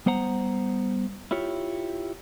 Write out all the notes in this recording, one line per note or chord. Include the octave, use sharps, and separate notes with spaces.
G3 B3 C5 F#5 A#5
E4 F4 G4 C#5